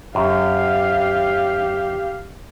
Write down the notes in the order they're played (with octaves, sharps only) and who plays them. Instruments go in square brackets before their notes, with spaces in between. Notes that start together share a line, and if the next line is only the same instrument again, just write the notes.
[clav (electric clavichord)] F#2 [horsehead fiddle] G4 F5